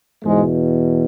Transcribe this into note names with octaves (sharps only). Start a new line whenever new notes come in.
E2 G#2 B2 G#3